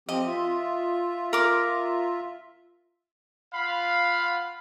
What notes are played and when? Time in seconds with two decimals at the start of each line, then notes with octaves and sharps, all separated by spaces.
0.09 F3 C4 G4 D#5
0.27 F4 E5
1.33 A#4 D6
3.53 F4 F5 F#5 B5